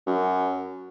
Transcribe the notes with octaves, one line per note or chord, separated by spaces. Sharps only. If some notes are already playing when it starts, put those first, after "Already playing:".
F#2